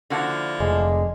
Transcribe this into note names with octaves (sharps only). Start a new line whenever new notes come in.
D3 F3 A#3 E4 F#4 F#5
F1 G#3